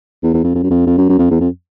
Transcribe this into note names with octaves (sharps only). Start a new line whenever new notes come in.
E2
E2
F2
F2
F#2
F2
F2
F#2
F#2
F2
E2
F2